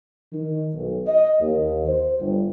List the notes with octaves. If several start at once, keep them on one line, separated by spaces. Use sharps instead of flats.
D#3
B1
D#5
D#2
C5
G1